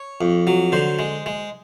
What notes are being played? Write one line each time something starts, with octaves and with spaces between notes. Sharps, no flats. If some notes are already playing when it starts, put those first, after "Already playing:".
Already playing: C#5
F2
F#3
D3 C5
G#3
G#3